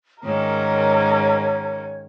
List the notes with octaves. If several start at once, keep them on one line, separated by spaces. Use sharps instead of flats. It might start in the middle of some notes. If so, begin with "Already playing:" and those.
G#2 D#3 C#4 A#4 C#5